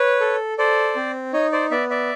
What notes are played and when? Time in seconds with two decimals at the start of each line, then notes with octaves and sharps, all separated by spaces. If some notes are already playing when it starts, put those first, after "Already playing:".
Already playing: B4 C#5
0.20 A4
0.58 A4 C5 D5
0.96 C4
1.33 D#4 C#5 D#5
1.52 C5 D5
1.71 B3 D5 E5
1.90 D5 E5